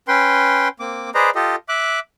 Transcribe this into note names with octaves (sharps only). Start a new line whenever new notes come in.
C#4 B4 G5 C6
A#3 C4 D6
G#4 B4 C5 D5 D#5 A#5
F4 G4 A4 D#5
E5 D6 F#6